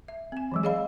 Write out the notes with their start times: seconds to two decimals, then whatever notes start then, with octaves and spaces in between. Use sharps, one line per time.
0.08 E5
0.32 C4 G#5
0.52 E3 F#3 G#3
0.63 G#4 C#5 D#5 F5 B5